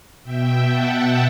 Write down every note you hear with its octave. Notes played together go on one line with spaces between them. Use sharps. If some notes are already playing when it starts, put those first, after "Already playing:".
B2 E5 G5
F#5 A5